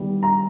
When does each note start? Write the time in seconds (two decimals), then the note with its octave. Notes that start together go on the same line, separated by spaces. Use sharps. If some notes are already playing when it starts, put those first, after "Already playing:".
Already playing: D#3 G3 B3 E4
0.23 A#5